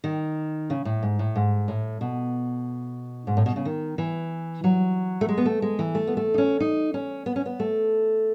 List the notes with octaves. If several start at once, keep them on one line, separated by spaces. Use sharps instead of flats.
D#3
C#3
A2
G#2
A2
G#2
A2
B2
G#2
A2
B2
C#3
D#3
E3
F#3
A3
G#3
B3
A3
G#3
E3
A3
B3
A3
D#4
C#4
D#4
C#4
B3
C#4
B3
A3